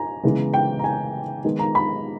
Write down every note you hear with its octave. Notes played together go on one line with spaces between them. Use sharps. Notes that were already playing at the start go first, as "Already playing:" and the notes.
Already playing: G#5 A#5
C#3 E3 G#3 B3
G5
A#5
G#5
D#3 G#3 B3
A#5
B5